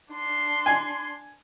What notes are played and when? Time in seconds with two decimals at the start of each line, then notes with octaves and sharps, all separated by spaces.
0.12 D4 C6
0.66 G#5